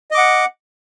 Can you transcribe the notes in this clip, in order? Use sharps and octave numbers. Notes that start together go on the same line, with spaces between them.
D#5 F#5 D6